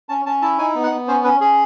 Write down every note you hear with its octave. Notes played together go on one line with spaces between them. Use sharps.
C#4 A5
C#4 A5
E4 A5
D#4 G#5
B3
F#5
B3
C#4 C5
C#4 B4
C#4 G#4